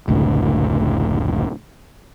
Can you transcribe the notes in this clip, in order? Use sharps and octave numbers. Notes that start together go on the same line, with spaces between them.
F1 C#2 A2 D3